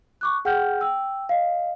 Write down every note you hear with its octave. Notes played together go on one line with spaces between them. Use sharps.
C#6 D6 F#6
G#4 F#5 G5 F6 G6
G5 E6
D#5 F5